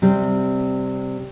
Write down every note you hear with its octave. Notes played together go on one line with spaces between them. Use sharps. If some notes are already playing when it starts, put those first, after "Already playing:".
C3 G3 C4